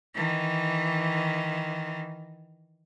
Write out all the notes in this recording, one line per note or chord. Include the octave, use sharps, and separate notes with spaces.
D#3 E3